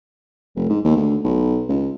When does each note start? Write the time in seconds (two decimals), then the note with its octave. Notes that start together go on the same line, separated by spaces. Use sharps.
0.56 F1
0.69 G#2
0.85 D#2
0.96 D2
1.24 B1
1.69 C#2